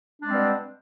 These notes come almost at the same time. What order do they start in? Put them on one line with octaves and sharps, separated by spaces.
D4 G#3 C4 G3 B2